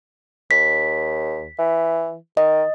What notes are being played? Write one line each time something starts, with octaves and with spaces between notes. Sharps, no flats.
D#2 B6
E3
D#3 D#5